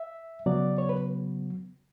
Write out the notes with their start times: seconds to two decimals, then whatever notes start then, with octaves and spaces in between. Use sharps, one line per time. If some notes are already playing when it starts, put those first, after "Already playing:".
Already playing: E5
0.46 C#3 F#3 B3 D5
0.78 C#5
0.89 B4